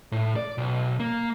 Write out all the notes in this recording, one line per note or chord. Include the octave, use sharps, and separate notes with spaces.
A2
D5
B1
A#3